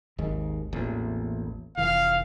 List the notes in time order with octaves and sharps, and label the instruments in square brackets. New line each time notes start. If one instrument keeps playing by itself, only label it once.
[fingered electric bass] G#1 D#2 G#2
A1 E2 A#2
[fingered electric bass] F1 E3 [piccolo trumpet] F5